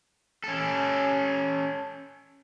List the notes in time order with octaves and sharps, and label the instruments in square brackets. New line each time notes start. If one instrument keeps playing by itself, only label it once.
[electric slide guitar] C#4 A4